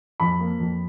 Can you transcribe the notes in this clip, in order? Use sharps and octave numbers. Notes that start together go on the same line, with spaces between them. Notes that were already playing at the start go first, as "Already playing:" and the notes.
F2 B5
A#3
F2